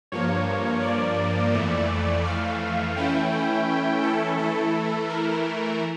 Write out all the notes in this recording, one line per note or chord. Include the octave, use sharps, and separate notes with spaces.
G2 F3 A#3 C#5
D5
F2 E3 A3
F5
E3 A3 C#4 E4 G5
G5
A4
E3 A3 E4 A4
A#4